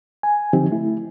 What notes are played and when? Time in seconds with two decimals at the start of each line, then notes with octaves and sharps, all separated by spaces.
0.23 G#5
0.53 D3 F3 C4 D#4 G4
0.71 A3 E4